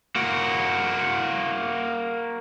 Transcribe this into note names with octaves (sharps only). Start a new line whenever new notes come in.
A#3 F#4